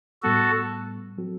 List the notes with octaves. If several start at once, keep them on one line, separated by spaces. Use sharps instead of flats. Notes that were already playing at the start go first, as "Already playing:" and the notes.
A2 G3 B3 F#4 A4
F#3 C4 F#4 A4